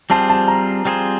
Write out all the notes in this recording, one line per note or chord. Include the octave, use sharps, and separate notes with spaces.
G3 C4 F4 G#4 C5 A5
A5
A#5
G3 C4 F4 G#4 C5